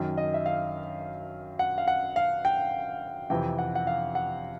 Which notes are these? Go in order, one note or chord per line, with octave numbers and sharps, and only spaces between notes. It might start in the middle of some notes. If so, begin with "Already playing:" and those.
Already playing: F#2 D#3
D#5
E5
F5
F#5
F5
F#5
F5
G5
F2 C3 E3 G5
F#5
F#5
F5
F#5